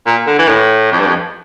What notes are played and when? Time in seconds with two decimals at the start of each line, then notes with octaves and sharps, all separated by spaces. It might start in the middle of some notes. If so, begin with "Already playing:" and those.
0.06 A#2
0.27 D3
0.38 E3
0.49 A2
0.92 F2
1.00 G2
1.07 F2